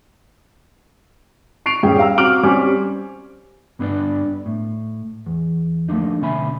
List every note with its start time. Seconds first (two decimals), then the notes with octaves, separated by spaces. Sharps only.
1.66 C#6 C7 D7 F7
1.83 D#1 G2 G3 C#4 G#4 G5
1.99 F5 A#5 E6
2.18 C4 F#4 D6 F6 D7 F#7
2.43 G3 C4 C#4 G#5 D6
3.79 G2 B3 D4 F4 B4 D5
4.46 A2
5.26 E2
5.89 F3 A3 A#3 D4 D#4
6.21 D2 B2 C#4 E5 G#5 B5